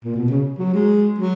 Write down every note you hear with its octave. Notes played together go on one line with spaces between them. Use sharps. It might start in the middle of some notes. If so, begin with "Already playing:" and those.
A#2
B2
C#3
F#3
G#3
F#3